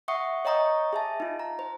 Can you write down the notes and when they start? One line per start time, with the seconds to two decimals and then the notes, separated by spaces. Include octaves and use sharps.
0.08 E5 F#5 C#6 D#6 C#7
0.45 C#5 D#5 G5 A#5 C#6 D#6
0.93 G#4 E5 A5
1.20 D#4 F4
1.39 A#5
1.59 C5